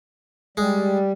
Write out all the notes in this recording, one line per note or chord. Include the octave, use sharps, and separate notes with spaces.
G3 G#3